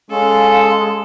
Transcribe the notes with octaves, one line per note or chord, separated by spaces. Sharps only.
G#3 C#4 A4 F5